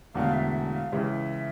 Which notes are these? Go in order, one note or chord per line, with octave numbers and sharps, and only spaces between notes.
E1 E2 D3 A3 F5
E5
E5
F5
C#2 C#3 E3 E5